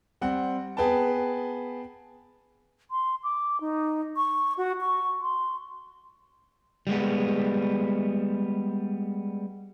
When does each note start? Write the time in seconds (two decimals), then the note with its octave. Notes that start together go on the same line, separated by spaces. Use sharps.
0.21 G3 C4 F#5
0.77 B3 G#4 B4 G5 A5
2.91 C6
3.24 D6
3.61 D#4
4.17 C#6
4.58 F#4
4.81 C#6
5.22 C6
6.87 G3 G#3 B3